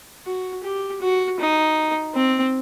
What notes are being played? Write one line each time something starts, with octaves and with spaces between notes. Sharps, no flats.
F#4
G4
F#4
D#4
C4